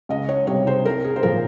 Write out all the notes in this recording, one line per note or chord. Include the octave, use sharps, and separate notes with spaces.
C#2 D#5
C#5
C3 G3 C#5
C5
C2 A#4
G#4
C5
A#2 F3 A#4